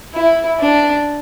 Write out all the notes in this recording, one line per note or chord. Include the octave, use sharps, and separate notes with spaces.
E4
D4